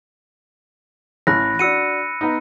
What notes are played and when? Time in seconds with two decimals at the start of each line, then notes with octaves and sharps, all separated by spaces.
1.27 A1 B5 F#6 A#6
1.59 D4 F#4 E6 C#7 D#7
2.21 B3 D#4